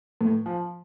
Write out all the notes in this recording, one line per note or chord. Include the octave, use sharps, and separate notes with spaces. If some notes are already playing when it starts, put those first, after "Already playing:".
A2
F3